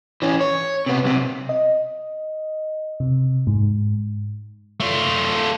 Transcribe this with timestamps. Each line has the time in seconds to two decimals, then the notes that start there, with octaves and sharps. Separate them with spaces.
0.22 E3 C#4
0.41 C#5
0.86 C3 B3
1.04 B1 C3
1.49 D#5
3.00 C3
3.47 G#2
4.80 A3 F4